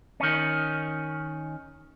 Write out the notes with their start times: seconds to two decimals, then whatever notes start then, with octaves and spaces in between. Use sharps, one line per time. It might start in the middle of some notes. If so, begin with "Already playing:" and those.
0.20 D#3 C#4